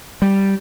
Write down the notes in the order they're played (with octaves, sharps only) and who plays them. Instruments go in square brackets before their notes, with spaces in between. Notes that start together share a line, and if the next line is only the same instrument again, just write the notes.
[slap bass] G3